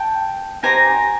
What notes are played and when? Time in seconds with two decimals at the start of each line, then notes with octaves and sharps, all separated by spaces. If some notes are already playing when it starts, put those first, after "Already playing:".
Already playing: G5 A5
0.63 D#4 G4 C5 G#5 A#5